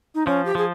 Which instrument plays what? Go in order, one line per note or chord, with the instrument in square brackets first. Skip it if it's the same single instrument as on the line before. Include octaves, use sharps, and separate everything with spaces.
[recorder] D#4
[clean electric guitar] F3 [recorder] C#4
[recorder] G4
[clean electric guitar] F3 [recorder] G#4